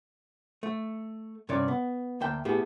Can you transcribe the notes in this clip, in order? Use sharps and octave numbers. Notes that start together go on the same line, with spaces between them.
A3
G2 C3 C#4 C#5 D5
B3
D2 A#3 E5 G5
A2 B3 G4 G#4